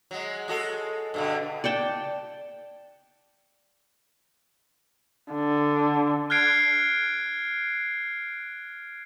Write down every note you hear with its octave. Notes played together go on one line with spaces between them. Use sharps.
F#3 G#3
G#3 F#4 A4
G2 B2 D3
D5 F#5 G5 A5
D3
F6 F#6 G#6 C7 D7